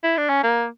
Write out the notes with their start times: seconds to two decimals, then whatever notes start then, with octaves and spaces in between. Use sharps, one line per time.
0.04 E4
0.18 D4
0.29 C#4
0.44 A#3